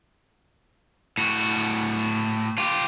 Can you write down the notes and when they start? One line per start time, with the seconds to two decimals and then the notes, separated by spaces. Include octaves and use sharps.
1.18 A2 F#4
2.58 F4 G4